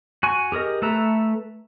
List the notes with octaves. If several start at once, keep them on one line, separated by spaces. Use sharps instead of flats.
F#4 G#5 C#6
G4 G#4 A#4 D#5
A3 A4 B4 E5 A#5